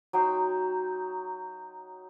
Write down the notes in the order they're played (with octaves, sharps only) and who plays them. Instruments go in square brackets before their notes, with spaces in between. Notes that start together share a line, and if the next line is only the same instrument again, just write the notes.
[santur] F#3 D#4 G5 C6